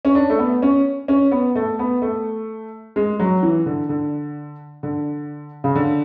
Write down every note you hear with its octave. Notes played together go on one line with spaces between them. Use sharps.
C#4
D4
A3
B3
C#4
C#4
B3
A3
B3
A3
G#3
F#3
E3
D3
D3
D3
C#3
D3